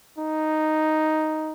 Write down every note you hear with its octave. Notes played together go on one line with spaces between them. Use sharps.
D#4